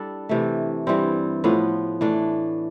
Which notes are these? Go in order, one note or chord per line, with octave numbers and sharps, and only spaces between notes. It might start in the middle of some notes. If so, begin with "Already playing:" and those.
Already playing: G3 D4 E4 A4
C3 E3 A3
G2 E3 G3 C4
A2 F3 B3
E3 A3 D4